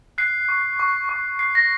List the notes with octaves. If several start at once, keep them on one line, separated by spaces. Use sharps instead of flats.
F#6 C7
C#6
C#6
C#6
F#6 C7
A#6